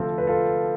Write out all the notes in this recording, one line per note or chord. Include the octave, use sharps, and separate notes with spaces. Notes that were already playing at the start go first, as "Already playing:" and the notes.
Already playing: D2 C3 F3 C4 F4 A4
B4
F4 A4